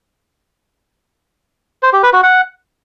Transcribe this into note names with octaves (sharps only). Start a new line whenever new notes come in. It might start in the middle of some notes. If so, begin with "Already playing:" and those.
C5
G4
B4
F#4
F#5